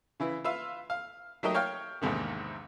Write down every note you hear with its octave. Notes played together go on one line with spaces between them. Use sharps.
C#3 E3 E4
F4 B4 E5 F5
F5
F#3 A3 D#4 G4 A#4 D#5
C#5 F5 G5 F6
A#1 E2 G#2 C3 D#3